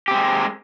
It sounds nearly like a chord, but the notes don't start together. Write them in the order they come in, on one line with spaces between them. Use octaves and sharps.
G4 C4 G#3